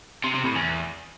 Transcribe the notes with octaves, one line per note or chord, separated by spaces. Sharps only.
C3
C3
A2
E2